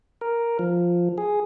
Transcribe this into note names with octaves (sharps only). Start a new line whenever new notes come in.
A#4
F3
G#4